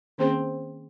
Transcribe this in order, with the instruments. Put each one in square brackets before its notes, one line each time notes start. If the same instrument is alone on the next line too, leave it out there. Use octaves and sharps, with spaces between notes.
[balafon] D#3 A#3 C#4 G#4 C5 [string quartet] C4